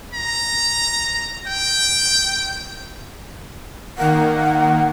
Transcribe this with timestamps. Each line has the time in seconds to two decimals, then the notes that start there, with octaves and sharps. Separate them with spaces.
0.14 A#5
1.47 G5
3.98 D#3 A#3 F#5